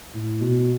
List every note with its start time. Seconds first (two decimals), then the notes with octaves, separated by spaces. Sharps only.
0.13 A2
0.41 B2